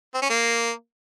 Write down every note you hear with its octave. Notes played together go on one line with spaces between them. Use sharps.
C4
C#4
A#3